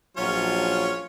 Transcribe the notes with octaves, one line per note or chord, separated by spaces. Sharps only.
A#1 F#3 C#4 F4 C#5